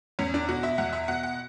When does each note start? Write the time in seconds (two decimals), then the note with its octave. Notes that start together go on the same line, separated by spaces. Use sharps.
0.19 E2 C#4
0.34 D4
0.49 B2 F#4
0.63 E5
0.78 E2 F#5
0.93 E5
1.08 B2 F#5
1.23 F#5